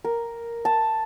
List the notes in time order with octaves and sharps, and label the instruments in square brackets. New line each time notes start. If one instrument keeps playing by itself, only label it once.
[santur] A#4
A5